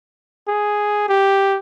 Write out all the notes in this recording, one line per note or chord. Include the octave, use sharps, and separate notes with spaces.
G#4
G4